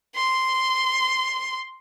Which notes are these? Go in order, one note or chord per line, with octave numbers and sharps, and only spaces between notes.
C6